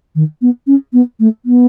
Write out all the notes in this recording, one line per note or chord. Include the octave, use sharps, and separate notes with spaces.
D#3
B3
C#4
B3
A3
B3